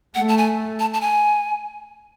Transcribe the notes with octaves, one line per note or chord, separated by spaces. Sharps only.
A3 F#5
A5
G#5
A5
A5
G#5